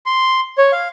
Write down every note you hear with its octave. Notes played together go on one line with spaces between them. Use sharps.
C6
C#5
F5